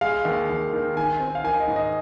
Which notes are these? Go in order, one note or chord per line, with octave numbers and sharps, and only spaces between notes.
G#3 F5
D#2
D#2
D#3
D#3 G#5
C4
F5
D#3 G#5
D#5
G#2
D#5